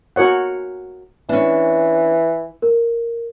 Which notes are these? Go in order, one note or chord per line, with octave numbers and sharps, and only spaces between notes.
F#4 A#4 C#5 F#5
E3 C#4 D4
A#4